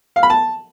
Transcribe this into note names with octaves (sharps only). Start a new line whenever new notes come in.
F5
B5
A5